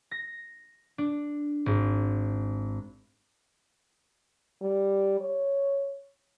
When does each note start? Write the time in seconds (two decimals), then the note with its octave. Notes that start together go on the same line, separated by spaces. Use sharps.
0.11 A#6
0.98 D4
1.66 G#1
4.62 G3
5.20 C#5